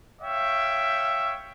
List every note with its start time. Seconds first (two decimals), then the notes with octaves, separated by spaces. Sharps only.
0.20 C#5 E5 F5 G5